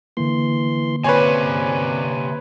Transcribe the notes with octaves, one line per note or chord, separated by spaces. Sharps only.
D3 E3 A#3 C6
C3 C4 C#4 B4 C#5 D5 G#5